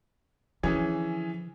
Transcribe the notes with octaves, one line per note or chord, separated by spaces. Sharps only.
D3 E3 F3 C#4 G#4